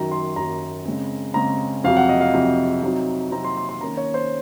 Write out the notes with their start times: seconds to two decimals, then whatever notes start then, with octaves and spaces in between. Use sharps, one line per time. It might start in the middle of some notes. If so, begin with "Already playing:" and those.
Already playing: F#2 D#3 F#3 A#5
0.11 C6
0.36 F#2 D#3 F#3 A#5
0.86 C#3 G#3 C4
1.34 C#3 G#3 C4 A#5
1.84 F2 C3 F#3 F5
1.97 F#5
2.09 D#5
2.21 F5
2.34 F2 C3 F#3
2.83 C3 F#3 C4 D#4
3.31 C3 F#3 C4 D#4 A#5
3.45 C6
3.57 C6
3.69 C6
3.81 D#3 A#3 C#4 A#5
3.97 C#5
4.14 C5